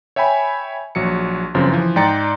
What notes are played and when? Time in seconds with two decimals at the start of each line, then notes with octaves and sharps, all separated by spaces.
0.16 C#5 E5 G5 G#5 B5
0.95 A#1 F#3 C#7
1.54 G1 F#2 C#3 F3 C4
1.72 E3 F3
1.96 G#2 D5 G5 A#5 A6 C#7